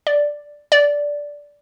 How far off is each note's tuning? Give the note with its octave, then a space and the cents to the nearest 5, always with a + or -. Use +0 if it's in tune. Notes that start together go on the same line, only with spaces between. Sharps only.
D5 +0
D5 -10